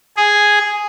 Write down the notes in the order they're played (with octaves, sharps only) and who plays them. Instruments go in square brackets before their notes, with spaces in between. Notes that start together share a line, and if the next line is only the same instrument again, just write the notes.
[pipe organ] G#4